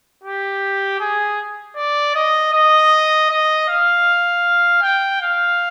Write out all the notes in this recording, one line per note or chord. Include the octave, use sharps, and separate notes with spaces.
G4
G#4
D5
D#5
D#5
D#5
F5
G5
F5